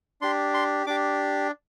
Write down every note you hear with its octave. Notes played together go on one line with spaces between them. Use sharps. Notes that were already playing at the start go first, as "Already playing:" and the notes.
D4 G4 C6
C6
D4 G4 D6